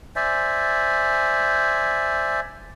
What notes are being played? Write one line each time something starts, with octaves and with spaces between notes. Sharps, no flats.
C5 D5 E5 G#5